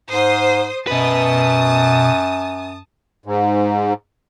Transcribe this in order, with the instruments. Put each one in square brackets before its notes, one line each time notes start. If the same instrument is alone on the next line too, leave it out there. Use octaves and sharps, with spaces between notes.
[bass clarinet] G#2 [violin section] C5 D#6
[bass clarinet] F#2 [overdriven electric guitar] B2 B4 [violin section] A5 D#6
[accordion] G#2